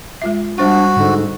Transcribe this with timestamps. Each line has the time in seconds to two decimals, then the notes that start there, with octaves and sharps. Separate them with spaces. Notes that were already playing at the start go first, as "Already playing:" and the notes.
0.22 G#3 F4 E5
0.58 G3 D4 F#4 C5 F#5
0.97 G#2 D3